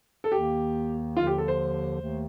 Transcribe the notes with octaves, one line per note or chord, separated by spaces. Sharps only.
A4
D#2 D#3 A#3 G4
D#2 D3 F3 F4
G4
A4
C5
D#2 D#3 A3